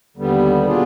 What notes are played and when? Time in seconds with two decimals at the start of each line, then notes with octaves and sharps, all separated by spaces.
0.17 D#2 D3 G3 B3
0.66 B2 B3 D4 F4 G#4